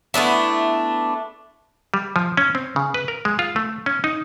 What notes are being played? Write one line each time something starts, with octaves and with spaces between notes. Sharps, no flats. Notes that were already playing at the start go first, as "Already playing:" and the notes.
A3 B3 D4 E4
G3
F3
C#4
C4
C#3
B4
A#4
G#3
F4
A3
C#4
D#4